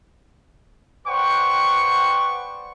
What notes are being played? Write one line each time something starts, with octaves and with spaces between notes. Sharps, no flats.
B4 C5 D5 F#5 G5 C#6